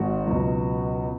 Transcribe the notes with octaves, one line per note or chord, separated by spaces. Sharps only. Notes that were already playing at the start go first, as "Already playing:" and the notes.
Already playing: G#1 G#2 F#4
C#2 B2 F#3